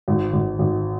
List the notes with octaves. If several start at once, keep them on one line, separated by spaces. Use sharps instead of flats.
G#1
G#1
G#1